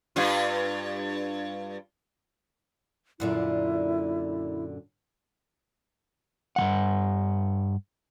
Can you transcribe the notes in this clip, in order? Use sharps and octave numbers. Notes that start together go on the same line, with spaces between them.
G2 F4
F#2 A#2 D3 E4
G2 E3 F#5